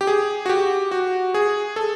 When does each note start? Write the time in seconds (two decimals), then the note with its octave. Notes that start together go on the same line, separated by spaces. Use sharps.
0.01 G4
0.07 G#4
0.46 F#4
0.49 G4
0.91 F#4
1.34 G#4
1.76 A4